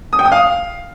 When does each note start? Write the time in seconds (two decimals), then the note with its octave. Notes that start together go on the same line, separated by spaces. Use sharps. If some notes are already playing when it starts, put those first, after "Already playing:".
0.13 D#6
0.19 G5
0.25 D#6
0.32 F5